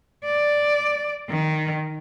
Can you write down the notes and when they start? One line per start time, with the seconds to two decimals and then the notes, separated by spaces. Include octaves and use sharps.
0.25 D5
1.30 D#3